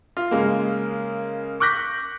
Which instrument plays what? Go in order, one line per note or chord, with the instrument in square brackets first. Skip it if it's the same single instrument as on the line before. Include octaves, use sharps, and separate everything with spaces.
[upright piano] F4
C#3 G#3 A#3
C#6 D6 F#6 G6 A#6 B6